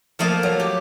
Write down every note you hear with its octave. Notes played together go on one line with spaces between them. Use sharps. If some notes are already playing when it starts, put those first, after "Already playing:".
F3 A3 A#3 D#5
F#3
G4